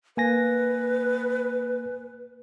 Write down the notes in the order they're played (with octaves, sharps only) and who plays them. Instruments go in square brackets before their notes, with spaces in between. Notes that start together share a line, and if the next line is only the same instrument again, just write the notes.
[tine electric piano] A#3 G#5 A#6 [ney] B4